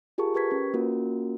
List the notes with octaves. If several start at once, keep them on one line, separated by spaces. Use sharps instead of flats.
F4 G4 G#4 A#4 A5 C#6
G4 A#4 B4 C#6 G#6 B6
C#4 B4
A#3 C#4 F4 F#4 A#4